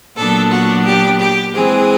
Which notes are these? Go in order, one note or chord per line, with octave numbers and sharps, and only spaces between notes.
A#2 F#3 B3 D4 A4
F#4
G4
G4
E3 G#3 C4 G#4